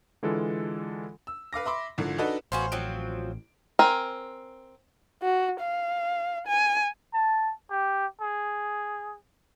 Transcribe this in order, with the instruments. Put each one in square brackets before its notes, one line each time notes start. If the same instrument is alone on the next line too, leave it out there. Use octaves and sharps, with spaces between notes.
[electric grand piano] D3 E3 G#3 F4 A4
[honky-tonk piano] E6
B4 F5 D6 A#6
E5 B5 C6 D6
G#1 D3 E3 F3
D4 D#4 F#4 A4 B4 D#5
[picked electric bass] A1 [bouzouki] B3 C#4 F#4 [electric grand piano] C5 F5 C6
[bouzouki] F3 F#3 C4 [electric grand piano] D7
[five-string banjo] C4 A#4 G#5
[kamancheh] F#4
F5
G#5
[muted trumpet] A5
G4
G#4